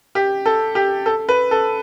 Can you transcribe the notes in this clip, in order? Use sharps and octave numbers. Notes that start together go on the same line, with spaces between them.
G4
A4
G4
A4
B4
A4